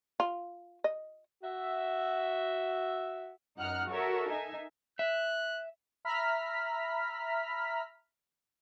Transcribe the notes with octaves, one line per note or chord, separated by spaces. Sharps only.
F4
D#5
F#4 E5
F#2 D#4 F#5 F6 F#6
F#4 A4 A#4 C#5 E5
D#4 E5 G#5
E5 F#6
E5 A#5 B5 F6 B6